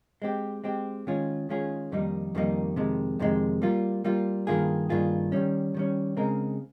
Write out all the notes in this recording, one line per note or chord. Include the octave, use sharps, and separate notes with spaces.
G#3 C4 G4
G#3 C4 G4
D#3 G#3 C#4 F4 G#4
D#3 G#3 C#4 F4 G#4
F2 D#3 G3 A#3 D#4
F2 D#3 G3 A#3 D#4
F2 C3 D#3 G#3
F2 C3 D#3 G#3
G3 A#3 F4
G3 A#3 F4
G2 D#3 A#3 F4 G#4
G2 D#3 A#3 F4 G#4
D#3 G3 C#4
D#3 G3 C#4
C#3 G#3 C4 D#4 A#4